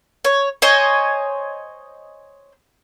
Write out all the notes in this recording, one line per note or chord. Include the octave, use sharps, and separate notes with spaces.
C#5
C5 C#5 D#5 G#5